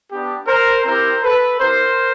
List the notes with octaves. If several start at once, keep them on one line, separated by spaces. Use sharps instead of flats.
B3 D4 G4
A#4 C5
C4 E4 G4 A#4 C5
A4 B4
C4 E4 G4 A#4 C5